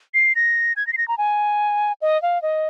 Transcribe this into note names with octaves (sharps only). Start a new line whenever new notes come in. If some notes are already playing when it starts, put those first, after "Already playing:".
C7
A#6
G#6
A#6
C7
A#6
A#5
G#5
D#5
F5
D#5